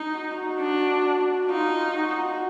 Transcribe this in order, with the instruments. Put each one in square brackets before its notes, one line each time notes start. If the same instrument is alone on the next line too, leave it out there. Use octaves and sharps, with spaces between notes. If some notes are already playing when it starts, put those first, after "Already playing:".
Already playing: [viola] D#4
[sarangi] F#4
[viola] D4
[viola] D#4 [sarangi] F4
[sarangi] F#4